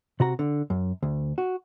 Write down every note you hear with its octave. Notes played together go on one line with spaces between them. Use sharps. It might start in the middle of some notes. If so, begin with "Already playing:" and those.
C3 F#4 A#5
D3
F#2
D2
F#4